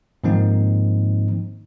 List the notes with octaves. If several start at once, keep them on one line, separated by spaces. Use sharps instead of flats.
G#2 D#3 F3 A#3 C4 D#4